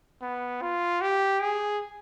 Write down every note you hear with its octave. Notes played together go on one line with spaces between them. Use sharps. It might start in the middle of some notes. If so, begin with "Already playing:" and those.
B3
F4
G4
G#4